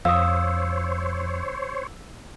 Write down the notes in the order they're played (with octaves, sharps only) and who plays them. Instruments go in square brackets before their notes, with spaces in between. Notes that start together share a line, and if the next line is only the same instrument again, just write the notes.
[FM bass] F2 [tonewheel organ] C5 C#5 [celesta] F5 D#6 [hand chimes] E6